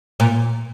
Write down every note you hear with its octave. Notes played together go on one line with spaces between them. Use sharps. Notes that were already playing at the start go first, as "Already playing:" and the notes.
A#2